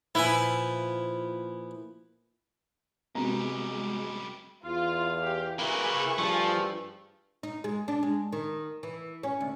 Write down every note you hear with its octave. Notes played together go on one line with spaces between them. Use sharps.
A#2 F3 B3 E4 G#5
F#2 C3 G3 G#3 B3 F#4 A#5
E2 F4 F5
G4
A#3 E4 G#4 B4 C#6
G2 F3 A3
D#4
G#3
D4
G#3
D#3
E3
C#4
D2